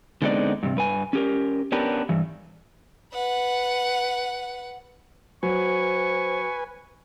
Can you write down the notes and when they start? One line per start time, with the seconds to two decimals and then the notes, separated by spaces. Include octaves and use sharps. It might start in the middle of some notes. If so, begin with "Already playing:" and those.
0.22 D3 G#3 B3 C4 D#4 D5
0.63 G2 C3
0.76 G2 B4 G#5
1.13 C#4 G4 A#4
1.72 B3 C#4 D4 G4 A#4 B4
2.09 G2 E3
3.13 B4 F#5
5.43 F#3 B4 C5 G#5 C#6